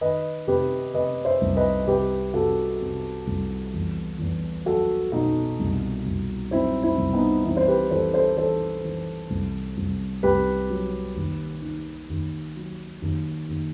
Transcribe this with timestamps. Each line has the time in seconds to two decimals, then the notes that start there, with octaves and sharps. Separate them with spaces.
0.01 D#3 B4 D#5
0.47 C3 G4 B4
0.94 C3 B4 D#5
1.25 C5 E5
1.41 C2
1.56 B4 D#5
1.87 C3 G4 B4
2.34 C3 F#4 A4
2.81 C3
3.27 C2
3.74 E2
4.19 E2
4.65 F#3 F#4 A4
5.12 B2 D#4 F#4
5.59 C2
6.06 C2
6.51 F#3 C4 E4
6.83 C4 E4
6.98 C2
7.13 B3 D#4
7.45 E3 C4 E4
7.57 C5
7.67 G4 B4
7.91 E3 A4 C5
8.14 A4 C5
8.37 E3 A4 C5
8.84 E3
9.30 C2
9.77 C2
10.23 C2 G4 B4
10.69 F#3
11.16 D#2
11.62 D#3
12.09 D#2
12.56 F#3
13.02 D#2
13.48 D#2